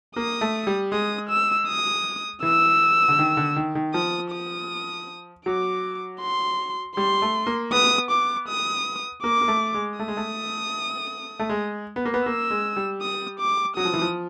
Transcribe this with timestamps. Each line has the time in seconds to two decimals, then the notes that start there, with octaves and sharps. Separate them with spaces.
0.16 A#3 D#6
0.41 A3
0.67 G3
0.92 G#3 D#6
1.29 E6
1.68 D#6
2.43 E3 E6
3.08 D3
3.19 D#3
3.37 D3
3.56 D#3
3.75 D#3
3.94 F3 D#6
4.32 D#6
5.45 F#3 D6
6.21 C6
6.96 G3 C6
7.22 A3
7.46 A#3
7.72 B3 D#6
8.11 D6
8.48 D#6
9.23 A#3 D6
9.41 A#3
9.48 A3
9.74 G#3
9.99 A3 D#6
10.08 G#3
10.17 A3
11.39 A3
11.49 G#3
11.96 B3
12.05 A#3
12.14 B3
12.25 A#3 E6
12.50 G#3
12.77 G3
13.01 D#6
13.40 D6
13.76 F#3 D#6
13.85 F3
13.94 E3
14.02 F3